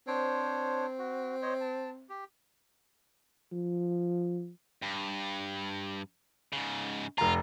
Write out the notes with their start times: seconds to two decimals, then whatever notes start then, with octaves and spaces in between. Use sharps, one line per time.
0.07 C4 D4 C5 C#5
0.99 F#4
1.42 C5 C#5 D#5
1.61 A5
2.09 G4
3.52 F3
4.82 G2
6.53 G#2 C#3
7.18 F1 F4 A#5